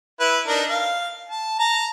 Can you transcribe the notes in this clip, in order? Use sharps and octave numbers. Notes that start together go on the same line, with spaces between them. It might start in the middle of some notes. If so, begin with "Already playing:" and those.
E4 B4
D4 D#4 A#4
F5
A5
A5 A#5